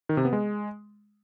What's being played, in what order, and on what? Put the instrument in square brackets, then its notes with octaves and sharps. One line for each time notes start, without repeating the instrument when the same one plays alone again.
[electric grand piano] D#3
C3
B3
G#3